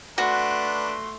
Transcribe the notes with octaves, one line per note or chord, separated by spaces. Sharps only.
A3 D4 F#4 B4 C6